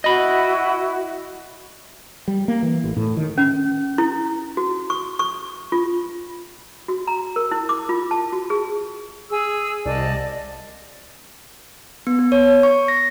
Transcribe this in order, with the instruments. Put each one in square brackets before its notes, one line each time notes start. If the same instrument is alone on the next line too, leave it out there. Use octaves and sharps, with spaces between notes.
[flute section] E4 F#4 [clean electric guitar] D#5 B5
[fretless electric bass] G3
A#3
E3
A1
A2
D#3
[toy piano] C#4
E4
F#4
C#6
C#6
F4
F#4
A#5
A#4
E4
D6
F4
A5
F#4
G#4
[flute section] G#4 E6
[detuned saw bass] C2 [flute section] D5 D#5 A5
[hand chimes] B3
B3
C#5
C#6
A#6